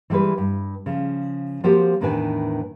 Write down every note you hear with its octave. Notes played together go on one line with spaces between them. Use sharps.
E3 G3 G#3 G#4 B4
G2
C#3 F3
F3 A#3 C4 F#4 G4 A#4
E2 A2 D#3 D4 B4 G#5